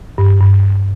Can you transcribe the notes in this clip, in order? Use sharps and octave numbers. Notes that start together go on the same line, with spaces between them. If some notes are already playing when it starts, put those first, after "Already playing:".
G2
G2